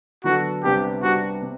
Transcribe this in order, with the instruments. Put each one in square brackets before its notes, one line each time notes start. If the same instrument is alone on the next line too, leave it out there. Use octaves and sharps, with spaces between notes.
[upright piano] D3 F#3 B3 D4 A4 [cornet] F#4
[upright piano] C2 C3 G3 B3 D4 [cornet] G4
[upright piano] C2 C3 G3 B3 D4 [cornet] F#4
[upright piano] C3